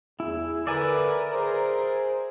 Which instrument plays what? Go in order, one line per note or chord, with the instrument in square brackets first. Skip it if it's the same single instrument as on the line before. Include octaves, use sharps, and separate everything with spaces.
[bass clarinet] E2 [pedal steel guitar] E4 [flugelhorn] G#4
[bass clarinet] D3 [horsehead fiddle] A#4 [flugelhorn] B4 [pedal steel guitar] D5 E5 G#5
[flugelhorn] G#4 [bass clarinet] C5